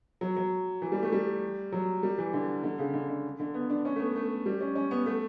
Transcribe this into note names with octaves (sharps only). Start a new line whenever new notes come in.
F#3
F#3
E3
G3
A3
G3
F#3
G3
E3
D3
D3
C#3
D3
D3
D3
B3
D4
C#4
A3
B3
A3
G3
C#4
C#4
B3
A3